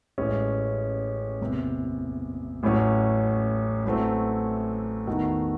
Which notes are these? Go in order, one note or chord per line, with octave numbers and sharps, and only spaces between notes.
A1 A2 G#3 C#4
F#1 E2 C3
A1 A2 F#3 C#4
A1 A2 F#3 A3 C4
E2 D#3 A3 D#4 F#4